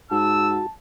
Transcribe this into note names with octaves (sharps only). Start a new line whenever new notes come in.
G#2 F#4 A5 E6